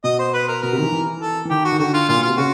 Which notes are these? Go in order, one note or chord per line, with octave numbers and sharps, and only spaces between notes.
B2 D#5
C5
B4
A#4
B2 A#4
C3
D#3
E3
E3
A4
E3
D#3 G4
F#4
D#3
D3 F#4
F4
A#2 F4
B2
C3 F4
C#3 F#4